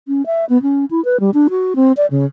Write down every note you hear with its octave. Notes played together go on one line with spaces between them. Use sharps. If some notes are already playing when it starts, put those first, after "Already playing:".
C#4
E5
B3
C#4
E4
B4
G3
D4
F#4
C4
D5
C#3